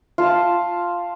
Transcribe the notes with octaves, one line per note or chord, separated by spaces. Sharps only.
F4 A5